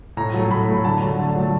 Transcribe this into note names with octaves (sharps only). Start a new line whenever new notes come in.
A2 A#5
F#3 A3
A2 B5
F#3 A3
D3 A5
F#3
A3
D3
F#3 A3